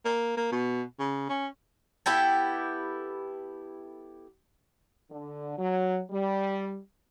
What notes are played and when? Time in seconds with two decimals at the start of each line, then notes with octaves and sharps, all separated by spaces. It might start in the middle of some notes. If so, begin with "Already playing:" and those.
0.05 A#3
0.37 A#3
0.52 B2
0.99 C#3
1.30 C#4
2.06 B3 E4 G4 A4
5.10 D3
5.58 F#3
6.11 G3